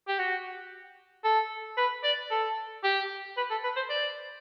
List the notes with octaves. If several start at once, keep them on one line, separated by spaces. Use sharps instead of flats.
G4
F#4
A4
B4
D5
A4
G4
B4
A4
B4
C5
D5